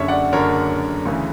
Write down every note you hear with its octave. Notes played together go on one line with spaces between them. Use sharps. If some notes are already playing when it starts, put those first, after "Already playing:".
Already playing: F#1 F#2 D3 C#5 E5
D5 F#5
F#1 F#2 D3 A#4 C#5
D2 C#3 E3